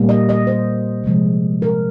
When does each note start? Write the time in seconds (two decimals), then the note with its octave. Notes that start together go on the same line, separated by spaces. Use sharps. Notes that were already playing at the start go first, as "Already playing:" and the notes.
Already playing: A#2 G3 A#3
0.09 D#5
0.29 D#5
0.47 C5
1.04 C3 F3 G#3
1.62 A#4